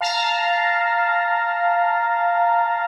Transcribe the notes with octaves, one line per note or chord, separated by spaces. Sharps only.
F5 A5 A#5